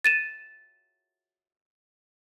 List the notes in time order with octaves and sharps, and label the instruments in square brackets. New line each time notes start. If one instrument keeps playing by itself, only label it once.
[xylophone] A6 D#7 E7